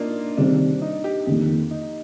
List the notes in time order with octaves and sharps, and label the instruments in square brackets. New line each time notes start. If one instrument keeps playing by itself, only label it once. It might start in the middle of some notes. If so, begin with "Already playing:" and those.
Already playing: [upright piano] A#3 D4 D#4 F4
[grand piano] C3 D#3 G3 C4 [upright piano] D4
[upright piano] D#4
G4
[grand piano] F2 D#3 A#3 [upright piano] G4
[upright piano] D#4